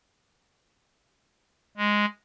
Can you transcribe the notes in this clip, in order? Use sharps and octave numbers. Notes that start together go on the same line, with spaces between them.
G#3